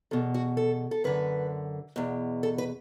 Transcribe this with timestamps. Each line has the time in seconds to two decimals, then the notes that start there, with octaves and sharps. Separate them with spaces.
0.11 E2 B2 A4
0.34 F#4
0.57 A4
0.91 A4
1.04 F#2 D3 B4
1.96 E2 B2
2.43 A4
2.58 B4